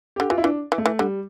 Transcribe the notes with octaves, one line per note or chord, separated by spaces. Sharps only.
D3 G4
E3 F4
E4
E3 D4
E3
A3
E3
D3 G3